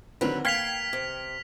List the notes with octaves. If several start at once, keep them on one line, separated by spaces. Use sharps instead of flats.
D3 D#3 F#3 C4 B4
A#3 G5 F6 G#6 B6 C7 F7
C3